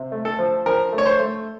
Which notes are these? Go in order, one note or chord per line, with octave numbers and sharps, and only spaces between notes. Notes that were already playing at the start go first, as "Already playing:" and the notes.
Already playing: C3
A3
A4
F3
F3 A#4
A3
C#5
C5
A3